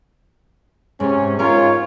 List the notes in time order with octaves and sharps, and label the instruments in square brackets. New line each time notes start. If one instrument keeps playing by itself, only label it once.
[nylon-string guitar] G#2 [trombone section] C3 C#4
[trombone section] G#2 F4 [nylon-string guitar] C#4 A#4 [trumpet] C#5